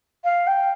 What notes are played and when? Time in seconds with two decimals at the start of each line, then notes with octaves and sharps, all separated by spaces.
0.24 F5
0.47 G5